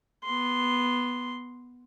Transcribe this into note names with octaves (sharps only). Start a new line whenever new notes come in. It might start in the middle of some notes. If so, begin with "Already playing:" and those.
B3 C6